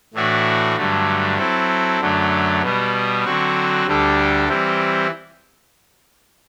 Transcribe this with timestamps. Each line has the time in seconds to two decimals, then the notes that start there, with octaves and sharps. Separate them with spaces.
0.14 A2 E3 A3 D4 F#4
0.76 G2 D3 F#3 A3
1.38 F#3 C4 E4 A4
2.00 F#2 D3 F#3 A3
2.62 B2 G3 B3
3.25 D3 F#3 C4 F#4
3.87 D2 D3 G3 D4 A4
4.49 E3 G3 C4 E4